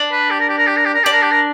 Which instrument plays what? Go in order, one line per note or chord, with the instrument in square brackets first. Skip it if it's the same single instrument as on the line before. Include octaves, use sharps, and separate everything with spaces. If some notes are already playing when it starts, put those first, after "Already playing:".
Already playing: [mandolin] D4
[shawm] B4
G4
A#4
G4
A#4
G4
A#4
G4
A#4
[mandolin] D4 [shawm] G4
[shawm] A#4
G4
A#4